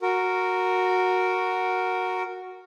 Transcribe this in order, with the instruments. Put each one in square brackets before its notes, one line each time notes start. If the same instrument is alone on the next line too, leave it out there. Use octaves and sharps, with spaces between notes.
[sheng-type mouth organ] F#4 A#4